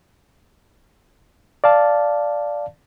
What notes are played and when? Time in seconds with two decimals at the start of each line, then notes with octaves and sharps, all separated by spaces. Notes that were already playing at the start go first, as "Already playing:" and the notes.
1.64 D5 F5 A5